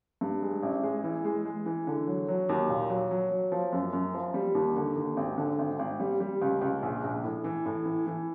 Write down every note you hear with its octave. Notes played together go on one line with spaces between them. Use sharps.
G2
G#3
A1
G#3
E3
G#3
G#3
E3
D3
F#3
F#3
D#2
A#2
F#3
F#3
F#3
F3
F#2
F#2
F3
G3
D#2
D3
D#2
G#1
D3
G#1
G#1
G3
G3
C#2
C#2
A#1
A#1
A2
E3
A2
E3
E3